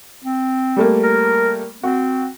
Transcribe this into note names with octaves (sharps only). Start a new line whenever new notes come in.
C4
G3 A3 A#3
A#4
C4 F#4